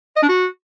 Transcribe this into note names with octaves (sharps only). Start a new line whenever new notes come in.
D#5
D4
F#4